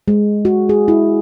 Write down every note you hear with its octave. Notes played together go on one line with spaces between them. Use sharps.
G#3
F#4
G#4
E4